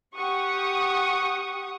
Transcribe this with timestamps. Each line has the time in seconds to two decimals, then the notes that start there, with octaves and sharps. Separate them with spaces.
0.16 G4 F#5 C#6 D#6